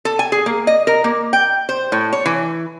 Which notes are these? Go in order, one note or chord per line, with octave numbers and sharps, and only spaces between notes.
A4
G#5
G#4
A#3
D#5
A#4
A#3
G5
C5
A2
C#5
E3